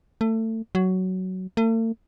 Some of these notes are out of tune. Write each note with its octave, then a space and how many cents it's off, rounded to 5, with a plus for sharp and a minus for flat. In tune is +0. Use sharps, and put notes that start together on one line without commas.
A3 +25
F#3 +10
A3 +45